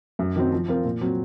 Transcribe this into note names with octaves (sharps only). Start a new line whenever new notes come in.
F#2
D#3 F#3 C4
F3
C4 F4 A#4
A#2
F#3 C4